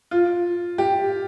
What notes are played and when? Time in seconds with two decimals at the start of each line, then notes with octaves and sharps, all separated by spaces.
0.11 F4
0.78 G4